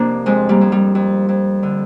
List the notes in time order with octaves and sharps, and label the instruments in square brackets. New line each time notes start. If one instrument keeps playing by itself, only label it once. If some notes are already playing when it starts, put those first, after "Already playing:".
Already playing: [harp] F2 C3 A#3 C4 D4
F2 G#3 C4
G3 A#3
F2
G3
F2
F2
D3